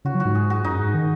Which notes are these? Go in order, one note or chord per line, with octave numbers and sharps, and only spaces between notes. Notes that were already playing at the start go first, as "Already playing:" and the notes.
C#3 F#4
F#3
F#4
G#2
G#4
F#4
F#2 D#4
G#2
D#3